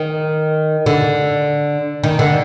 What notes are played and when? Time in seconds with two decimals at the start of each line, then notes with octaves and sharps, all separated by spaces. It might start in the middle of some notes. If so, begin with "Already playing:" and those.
Already playing: D#3
0.86 D3
2.04 D#3
2.19 D3